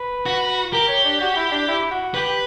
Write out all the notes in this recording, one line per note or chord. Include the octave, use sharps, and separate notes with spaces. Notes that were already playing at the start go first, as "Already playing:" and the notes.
Already playing: B4
F#4
G4 A#4
C#5
D4
F#4
E4
D4
E4
F#4
G4 B4